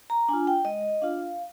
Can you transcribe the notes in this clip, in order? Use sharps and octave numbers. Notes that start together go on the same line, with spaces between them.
A#5
D4 F4 G#5
G5
G#3 D#5
D4 F4 F5